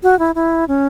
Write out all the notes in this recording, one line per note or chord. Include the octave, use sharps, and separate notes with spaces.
F#4
E4
E4
C#4